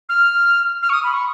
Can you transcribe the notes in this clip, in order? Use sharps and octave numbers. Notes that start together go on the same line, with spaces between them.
F6
F6
C#6
D#6
B5
C#6